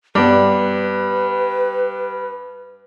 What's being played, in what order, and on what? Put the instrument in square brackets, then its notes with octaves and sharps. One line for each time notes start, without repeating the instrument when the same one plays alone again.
[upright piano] G2 [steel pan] G3 B3 [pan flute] B4 [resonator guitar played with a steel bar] D5